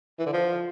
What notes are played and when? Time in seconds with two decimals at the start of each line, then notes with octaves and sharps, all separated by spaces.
0.19 E3
0.26 D3
0.33 F3